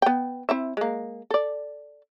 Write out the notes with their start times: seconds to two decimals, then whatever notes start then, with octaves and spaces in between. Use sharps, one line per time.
0.02 B3 G5
0.49 C4 E4 E5
0.77 G#3 A#3
1.31 A4 D5